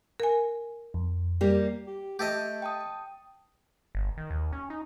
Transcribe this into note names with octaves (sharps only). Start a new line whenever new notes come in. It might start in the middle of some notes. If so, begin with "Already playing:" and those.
A#4 G#5
F2
G3 A#3 G4
G4
A3 G4 A4 D#5
G5 A5 D#6
G1
D#3
D#2
C#4
D#4